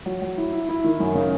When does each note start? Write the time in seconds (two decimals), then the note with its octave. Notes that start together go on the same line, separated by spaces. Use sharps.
0.06 F#3
0.22 F#3
0.37 E4
0.53 E4
0.69 E4
0.84 D#3
1.00 F#2
1.15 C#3